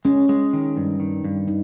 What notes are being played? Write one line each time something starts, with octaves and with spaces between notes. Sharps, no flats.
G#3 C#4
G#3
D#3
G2
D#3
G2
D#4